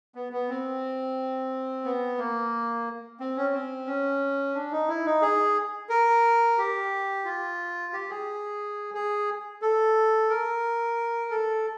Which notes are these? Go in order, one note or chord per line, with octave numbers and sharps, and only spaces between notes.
B3
B3
C4
B3
A#3
C4
C#4
C4
C#4
D4
D#4
E4
D#4
G#4
A#4
G4
F4
G4
G#4
G#4
A4
A#4
A4